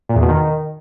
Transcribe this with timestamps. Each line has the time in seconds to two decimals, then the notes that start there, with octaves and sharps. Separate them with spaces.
0.09 A#2
0.16 E2
0.22 B2
0.28 D#3